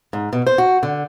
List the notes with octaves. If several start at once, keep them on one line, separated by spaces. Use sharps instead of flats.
G#2
B2
C5
F#4
D3